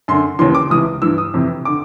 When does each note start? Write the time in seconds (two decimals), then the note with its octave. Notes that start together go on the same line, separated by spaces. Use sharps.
0.08 F#2 D3 C6
0.39 D#2 C#3 E3 C6
0.55 D6
0.70 C#2 C3 E3 D#6
1.02 G2 E3 E6
1.18 D#6
1.34 F2 C3 E3
1.65 D3 D6